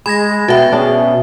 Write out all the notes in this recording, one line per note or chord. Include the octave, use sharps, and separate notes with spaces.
G#3 G#4 B5 G#6 A#6
B2 F#4 A4 E5 G5
C#4 D4 G#4